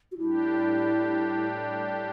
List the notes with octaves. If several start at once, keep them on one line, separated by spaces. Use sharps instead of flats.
F#4
A2 G3 D4 E4 G4